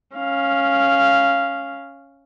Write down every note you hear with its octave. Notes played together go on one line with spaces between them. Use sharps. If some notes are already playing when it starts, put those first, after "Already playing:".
C#4 F5